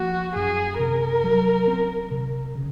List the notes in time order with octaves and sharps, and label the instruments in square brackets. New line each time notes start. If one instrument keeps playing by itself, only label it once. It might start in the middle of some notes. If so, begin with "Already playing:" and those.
Already playing: [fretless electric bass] F3 A#3 [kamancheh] F#4
[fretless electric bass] F#2 [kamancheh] G#4
[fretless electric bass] C3 [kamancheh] A#4
[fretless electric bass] F#3
C4
C3
C#3